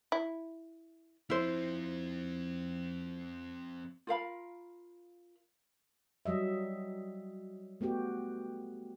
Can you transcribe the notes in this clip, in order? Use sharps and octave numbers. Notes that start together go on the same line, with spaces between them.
E4
F3 C4 E4 C5
F4 A#4 F5 B5
F#3 G3 D#5 E5
A3 B3 F#4 G4